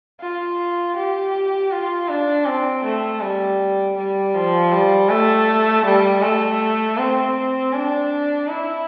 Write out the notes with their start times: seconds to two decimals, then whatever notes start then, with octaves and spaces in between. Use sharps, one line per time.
0.21 F4
0.96 G4
1.71 F4
2.09 D4
2.46 C4
2.84 A3
3.21 G3
3.97 G3
4.35 F3
4.73 G3
5.10 A3
5.85 G3
6.23 A3
6.98 C4
7.73 D4
8.48 E4